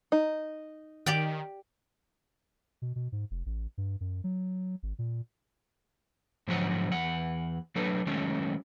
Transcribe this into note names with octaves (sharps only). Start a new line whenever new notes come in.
D#4
D#3 G4 D5 G5
B2
B2
G#2
F1
A1
G2
F#2
F#3
G#1
A#2
G#2 D3 F3 F#3 G#4 F#5
E2 F#5
F#3 A3 D4 A4 B4
D#3 F#3 G#3 A3 C#4